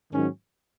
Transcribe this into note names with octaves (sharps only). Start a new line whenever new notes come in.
G#2 D#3 F#3 C#4